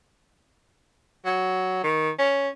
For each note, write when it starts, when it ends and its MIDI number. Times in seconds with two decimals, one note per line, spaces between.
1.25 1.82 54
1.84 2.10 51
2.19 2.49 61